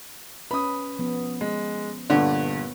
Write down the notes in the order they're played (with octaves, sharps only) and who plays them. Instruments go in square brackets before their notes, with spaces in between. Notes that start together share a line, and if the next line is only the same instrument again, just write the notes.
[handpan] C#4 B4 [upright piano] B5 D#6
[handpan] F3 B3
[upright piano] G#3
[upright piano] G2 A#2 [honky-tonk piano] D3 [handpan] B3 C#5